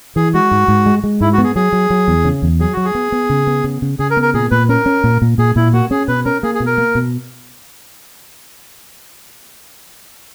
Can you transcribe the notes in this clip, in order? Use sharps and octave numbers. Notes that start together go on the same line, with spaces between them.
E3 G#4
G#3 F#4
G#2
G#2
G#3
G#3
G#2 E4
F#4
B3
G#4
F#3 G#4
F#3
F#3
E2
C#3
E2
F#3 G#4
F#3 F#4
G#4
B3
B3
C#3
B3
C#3
C#3
C#3 G#4
A#4
B3
A#4
A#2 G#4
A#2 B4
C#4 A#4
C#4
A#2
A#2
A#2 G#4
A#2 E4
A#3 F#4
C#4 G#4
B2 B4
C#4 A#4
A#3 G#4
G#4
B2
A#4
A#3
B2